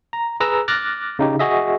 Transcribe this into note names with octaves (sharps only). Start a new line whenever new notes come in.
A#5
G#4 B4 A#5 E6
D6 F6 F#6 A6 A#6
C#3 D#4 G4
F#4 G#4 D#5 E5